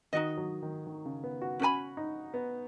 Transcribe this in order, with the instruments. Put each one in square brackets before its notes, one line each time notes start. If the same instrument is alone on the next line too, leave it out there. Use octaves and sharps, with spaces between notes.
[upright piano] D#3 [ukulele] D#4 F#4 D#5
[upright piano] F#3
D#3
D#3
C#3
B3
F#4
[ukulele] C#4 B4 G#5 B5 [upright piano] F#4
[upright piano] D#4
B3